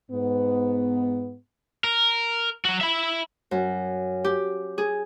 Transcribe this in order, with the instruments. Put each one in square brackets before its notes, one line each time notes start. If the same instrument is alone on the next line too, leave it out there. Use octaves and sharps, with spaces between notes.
[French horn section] G#2 B3
[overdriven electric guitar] A#4
F#3 F#4
E5 B5
[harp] F#2
G4
G#4